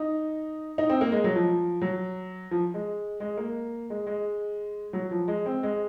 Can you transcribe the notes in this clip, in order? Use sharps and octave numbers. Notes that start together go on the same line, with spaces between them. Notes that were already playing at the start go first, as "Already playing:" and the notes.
Already playing: D#4
D#4
C4
A#3
G#3
F#3
F3
F#3
F3
G#3
G#3
A#3
G#3
G#3
F#3
F3
G#3
C4
G#3